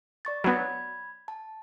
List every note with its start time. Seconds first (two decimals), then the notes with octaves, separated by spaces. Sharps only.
0.25 D5 C#6 A6
0.44 F#3 B3 B5 G#6
1.28 A5